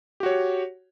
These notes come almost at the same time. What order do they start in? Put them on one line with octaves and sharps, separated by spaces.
G4 F#4 C#5